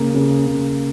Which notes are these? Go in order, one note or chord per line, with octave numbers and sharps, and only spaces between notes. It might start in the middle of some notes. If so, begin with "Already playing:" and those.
Already playing: C#3 A#3
C#3
C#3